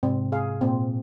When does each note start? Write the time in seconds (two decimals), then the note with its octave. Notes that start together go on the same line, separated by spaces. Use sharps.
0.03 G#2 C3 C4
0.32 G#4 F5
0.61 A#2 C4